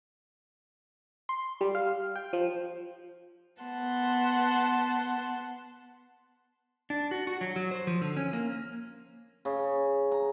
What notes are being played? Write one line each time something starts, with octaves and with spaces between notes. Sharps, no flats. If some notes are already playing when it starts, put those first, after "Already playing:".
C6
G3
F5
G5
F3
B3 F#5 A5 C6
D4
F#4
F#4
F#3
F#3
C5
F3
D3
C#4
A#3
C#3
A#5